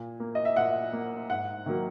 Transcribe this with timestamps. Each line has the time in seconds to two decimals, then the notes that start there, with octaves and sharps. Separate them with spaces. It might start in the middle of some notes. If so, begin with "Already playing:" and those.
Already playing: A#2
0.20 A#3
0.35 D#5
0.45 E5
0.56 A#2 F#5
0.93 A#3
1.30 G#2 F#5
1.66 D#3 F#3 A#3